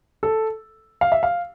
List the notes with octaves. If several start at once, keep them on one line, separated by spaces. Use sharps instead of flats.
A4
F5
E5
F5